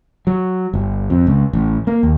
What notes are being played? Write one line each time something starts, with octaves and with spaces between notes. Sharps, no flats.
F#3
G1
F2
C#2
A1
A#3
D#2